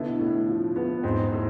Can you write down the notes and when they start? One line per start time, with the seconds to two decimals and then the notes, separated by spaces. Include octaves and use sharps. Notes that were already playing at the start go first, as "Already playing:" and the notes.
Already playing: B2 D3 B3 E4
0.19 A2
0.48 F3
0.76 B3
1.03 E2 G#2 C4
1.32 A2